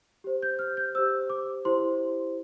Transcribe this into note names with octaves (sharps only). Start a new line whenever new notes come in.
G4 C5
G6
F6
G6
G4 C5 E6
D6
E4 G4 C5 C6